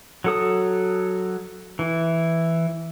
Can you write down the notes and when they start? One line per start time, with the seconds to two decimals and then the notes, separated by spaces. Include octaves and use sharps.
0.24 F#3 A4 D#6
1.79 E3